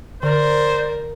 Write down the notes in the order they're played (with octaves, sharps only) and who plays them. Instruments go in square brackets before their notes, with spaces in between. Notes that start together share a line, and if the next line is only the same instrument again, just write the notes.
[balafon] D3 [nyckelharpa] A#4 [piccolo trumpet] C5 [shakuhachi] D5